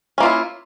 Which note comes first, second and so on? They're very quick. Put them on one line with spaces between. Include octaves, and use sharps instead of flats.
C#4 A#3 F4 E4